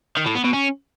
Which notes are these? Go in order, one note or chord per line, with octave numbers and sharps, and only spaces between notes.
D#3
A2
B3
B2
C#4